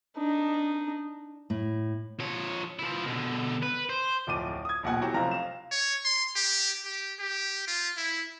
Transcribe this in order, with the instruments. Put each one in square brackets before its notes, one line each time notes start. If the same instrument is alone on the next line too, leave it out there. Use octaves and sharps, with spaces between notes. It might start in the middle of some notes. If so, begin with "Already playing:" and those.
[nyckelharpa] D4 D#4
[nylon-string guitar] A2
[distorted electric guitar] F3 C#5
F3 E4
B2 D3
B4
C5
[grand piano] D1 F2 D6 D#7
D#6 G#6
D#1 A#1 B2 F#5 G#5
E3 F#3 F#4 G4
F1 F2 C4 F5 A#5 A#6
F5 E7
[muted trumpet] C#5
C6
G4
G4
G4
F4
E4